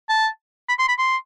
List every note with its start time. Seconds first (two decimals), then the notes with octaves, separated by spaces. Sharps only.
0.09 A5
0.68 B5
0.79 C6
0.88 B5
0.98 C6